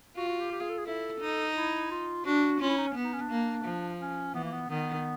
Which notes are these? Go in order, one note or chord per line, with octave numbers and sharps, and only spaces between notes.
F4 F#4
F#4
G4
G4
G#4
A4
G#4
E4 A4
D#4
E4
F4
D4 F#4
C#4 F4
E4
D#4
C#4
B3
D#4
C#4
D4
A#3
F3
C#4
E3 B3
A#3
B3
D#3 B3